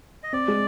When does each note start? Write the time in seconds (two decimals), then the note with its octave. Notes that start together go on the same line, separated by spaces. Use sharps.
0.23 D#5
0.33 C4 D5
0.48 G#3